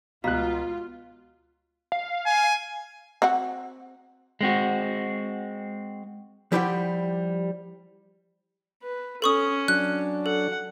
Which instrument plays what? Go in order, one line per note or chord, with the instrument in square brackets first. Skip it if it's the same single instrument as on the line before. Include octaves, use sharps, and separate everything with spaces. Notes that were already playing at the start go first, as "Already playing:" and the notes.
[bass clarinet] C#2 [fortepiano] B2 F#3 F#6 [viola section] F4 [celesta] F5 A#5 B6
[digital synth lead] F5
[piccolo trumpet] G#5
[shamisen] C4 F#4 F#5
[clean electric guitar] G#3 C4 F#4
[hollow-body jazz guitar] F3 G3 E4 G4 F#5 G5
[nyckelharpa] B4
[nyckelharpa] C#4 [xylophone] A4 C#6 D#6
[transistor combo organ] F#3 D4 [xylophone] F#6
[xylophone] A4 [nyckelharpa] F#5